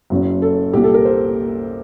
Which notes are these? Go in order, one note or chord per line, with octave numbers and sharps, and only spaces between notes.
F#1 F#2 F#3
A4
C2 A#2 G3 G4
A4
A#4
C5